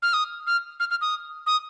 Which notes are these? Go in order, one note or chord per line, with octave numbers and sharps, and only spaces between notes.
F6
D#6
F6
F6
F6
D#6
D#6